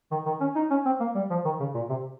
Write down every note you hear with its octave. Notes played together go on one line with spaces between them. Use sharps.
D#3
D#3
C#4
D#4
C#4
C4
A#3
G3
F3
D#3
C#3
A#2
C3